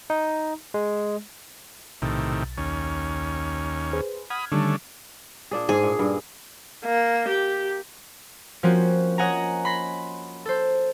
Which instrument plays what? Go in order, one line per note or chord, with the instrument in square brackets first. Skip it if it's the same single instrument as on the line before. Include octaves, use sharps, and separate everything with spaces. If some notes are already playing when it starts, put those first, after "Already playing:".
[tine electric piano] D#4
G#3
[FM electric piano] B1 A6 [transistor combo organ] A2 C3 D#3
[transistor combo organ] D#2 C#4
[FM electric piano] G#4 B4 C5
[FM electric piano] F#5 F6 G#6 [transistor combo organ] B5 D#6
[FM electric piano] D3 D#3 G3 [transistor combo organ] A3 C#4 D4
[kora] A#2 D4 G#4
[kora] G#2 [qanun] G#4
[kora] A#2
G2
[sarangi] A#3
G4
[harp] F3 A#3 C4 C#4 F#4
C#5 D#5 F#5 G#5 A#5
B5 C6 A#6
A4 C5